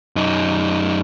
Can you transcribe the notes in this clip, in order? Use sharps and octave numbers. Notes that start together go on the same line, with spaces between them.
F#2 D#4